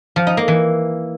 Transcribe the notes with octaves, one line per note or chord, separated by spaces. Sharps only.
F3
D#4
A#3
E3